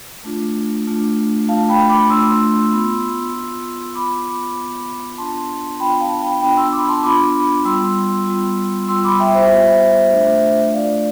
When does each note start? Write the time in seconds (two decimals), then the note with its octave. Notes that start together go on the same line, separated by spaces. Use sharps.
0.24 A3 D4 F4
0.87 A3 D4 F4
1.48 A3 D4 F4 F5 A5
1.69 G5 B5
1.89 B5 D6
2.10 A3 D4 F4 C6 E6
2.72 B3 F4
3.33 B3 F4
3.95 B3 F4 B5 D6
4.56 B3 F4
5.18 B3 D4 F4 A5 C6
5.80 B3 D4 F4 G5 B5
6.00 F5 A5
6.22 G5 B5
6.41 B3 D4 F4 G5 B5
6.57 C6 E6
6.72 B5 D6
6.88 A5 C6
7.03 B3 D4 F4 B5 D6
7.65 G3 B3 F4 C6 E6
8.27 G3 B3 F4
8.88 G3 B3 F4 C6 E6
9.04 B5 D6
9.19 E5 G5
9.34 C5 E5
9.51 G3 B3 F4
10.12 A3 D4 F4
10.74 A3 D4 F4 D5 F5